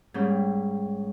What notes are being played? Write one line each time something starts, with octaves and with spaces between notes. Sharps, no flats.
G#2 G3 A#3 C#4 G#4 G5